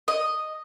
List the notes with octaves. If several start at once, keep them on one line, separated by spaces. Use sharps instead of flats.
D#5